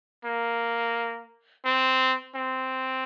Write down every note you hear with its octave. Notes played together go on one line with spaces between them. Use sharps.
A#3
C4
C4